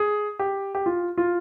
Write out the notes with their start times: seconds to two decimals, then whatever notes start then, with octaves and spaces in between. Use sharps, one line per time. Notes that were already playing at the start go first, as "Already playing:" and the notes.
Already playing: G#4
0.39 G4
0.75 G4
0.86 F4
1.18 F4